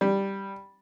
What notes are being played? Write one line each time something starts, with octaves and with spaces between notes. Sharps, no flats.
G3